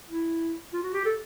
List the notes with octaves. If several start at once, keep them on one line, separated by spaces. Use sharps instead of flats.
E4
F4
F#4
G4
A4